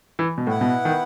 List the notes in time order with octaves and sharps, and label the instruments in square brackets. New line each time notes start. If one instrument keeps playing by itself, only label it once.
[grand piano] E3
B2
[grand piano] A2 [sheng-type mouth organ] B3 E4 B4 F#5
[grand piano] B2
D#3